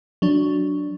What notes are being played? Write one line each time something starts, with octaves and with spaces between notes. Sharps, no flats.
F#3 D4